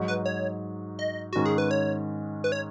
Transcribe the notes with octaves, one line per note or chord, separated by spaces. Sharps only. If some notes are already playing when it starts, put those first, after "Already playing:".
Already playing: G#2 F#3 D#4
B4
C#5
D#5
G#2 D#3 G#3 C#4 F#4
G#4
B4
C#5
B4
C#5